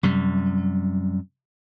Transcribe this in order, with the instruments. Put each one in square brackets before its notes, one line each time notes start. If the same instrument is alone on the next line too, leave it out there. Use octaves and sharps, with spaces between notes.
[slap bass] F#2 C3 G3